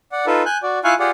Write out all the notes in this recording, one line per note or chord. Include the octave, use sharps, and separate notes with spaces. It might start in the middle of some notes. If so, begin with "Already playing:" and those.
D5 F#5
D#4 F4 A4 B4
G#5 F#6 G6
F#4 D5
E4 F4 F5 G#5 C#6 F#6
F4 G4 G#4 D5 F#5